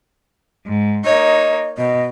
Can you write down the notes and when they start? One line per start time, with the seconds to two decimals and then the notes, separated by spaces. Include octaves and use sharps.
0.66 G#2
1.05 A#3 D#4 C#5 D#5
1.78 B2 D#5